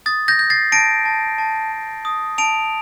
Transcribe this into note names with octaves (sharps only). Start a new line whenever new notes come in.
D#6 A6
G6 A#6
G6
A6 C7
A5 A#6 D7
A5
A5
A5
D#6
A5 D7 F7